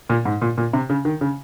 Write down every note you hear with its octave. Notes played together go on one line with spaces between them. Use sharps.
A#2
G#2
A#2
A#2
C3
C#3
D#3
C#3